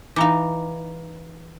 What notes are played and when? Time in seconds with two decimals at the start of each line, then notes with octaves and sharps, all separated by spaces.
0.16 E3 D#4 F5 A#5 D6